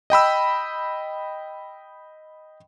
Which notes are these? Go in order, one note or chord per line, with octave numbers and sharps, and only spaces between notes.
D#5 G5 B5 E6